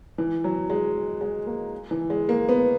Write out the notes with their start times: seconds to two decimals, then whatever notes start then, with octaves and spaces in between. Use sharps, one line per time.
0.18 E3
0.44 F#3
0.70 G#3
1.21 G#3
1.47 A#3
1.91 E3
2.10 G#3
2.29 A#3
2.49 B3